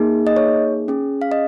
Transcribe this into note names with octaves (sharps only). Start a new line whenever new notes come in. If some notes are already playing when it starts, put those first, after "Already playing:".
Already playing: A#3 D#4 G#4
D#5
C#5
C#4 G#4
F5
D#5